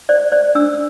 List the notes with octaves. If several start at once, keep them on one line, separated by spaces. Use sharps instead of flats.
C5 D5
C5 D5
D4 E6